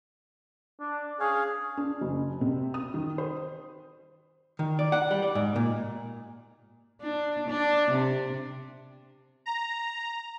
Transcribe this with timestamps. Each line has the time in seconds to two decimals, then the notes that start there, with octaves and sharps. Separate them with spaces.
0.80 D4
1.20 C#4 G#4 C#5 F5
1.77 D4
2.01 F#1
2.41 C3
2.74 D#6
2.94 D#3
3.18 C5
4.59 D#3
4.79 D5
4.92 F#5
5.11 G3
5.22 D5
5.35 G#2
5.56 A#2
7.02 D4
7.48 D4
7.92 C3
9.46 A#5